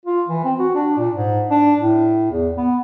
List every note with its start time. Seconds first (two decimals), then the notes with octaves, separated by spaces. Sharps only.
0.06 F4
0.28 E3
0.44 C4
0.59 F#4
0.75 D4
0.98 A#2
1.14 G#2
1.51 D4
1.79 A2
2.31 E2
2.57 B3